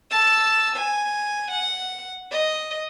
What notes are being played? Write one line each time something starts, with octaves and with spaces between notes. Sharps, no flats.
A5 E6
G#5
F#5
D#5